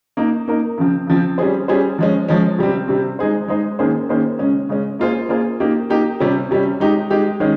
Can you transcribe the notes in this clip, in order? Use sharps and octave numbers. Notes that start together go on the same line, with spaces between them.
A#3 D#4 A#4
A#3 D#4 A#4
C#3 F3 C4
C#3 F3 C4
G3 C#4 G#4 C5
G3 C#4 G#4 C5
F3 G#3 C#4
F3 G#3 C#4
C3 G3 C4
C3 G3 C4
G#3 D#4 G#4 C5
G#3 D#4 G#4 C5
D#3 A#3 C#4 G#4 C5
D#3 A#3 C#4 G#4 C5
C#3 G#3 C#4
C#3 G#3 C#4
A#3 F4 G#4 C5
A#3 F4 G#4 C5
A#3 D#4 G4
A#3 D#4 G4
C3 G3 C#4
C3 G3 C#4
G#3 D#4 G4
G#3 D#4 G4
D#3 G#3 C#4